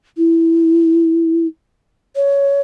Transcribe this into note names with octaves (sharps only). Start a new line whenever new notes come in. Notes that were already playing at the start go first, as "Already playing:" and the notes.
E4
C#5